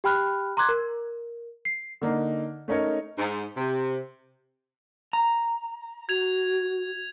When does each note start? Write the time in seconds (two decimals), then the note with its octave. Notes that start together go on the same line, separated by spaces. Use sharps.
0.04 G4 G5 B5 F6 F#6
0.57 A#5 C6 D6 F#6 G#6
0.69 A#4
1.65 C7
2.02 D3 A#3 D#4
2.68 A3 C#4 D#4 A#4 C#5
3.18 G#2
3.57 C3
5.13 A#5
6.09 F#4 G#6 F7